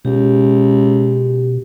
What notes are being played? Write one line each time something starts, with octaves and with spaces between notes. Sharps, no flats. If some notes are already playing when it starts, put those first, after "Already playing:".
C#2 B2 G4